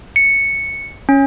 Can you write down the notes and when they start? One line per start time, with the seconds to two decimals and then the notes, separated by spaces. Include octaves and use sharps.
0.16 C#7
1.09 C#4